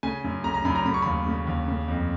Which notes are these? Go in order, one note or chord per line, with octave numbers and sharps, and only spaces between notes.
C#3 G#5
F#2
C#3 A#5
A#5
F#2 B5
A#5
C#3 B5
C#6
D#2 B5
C#3
D#2
C#3
F2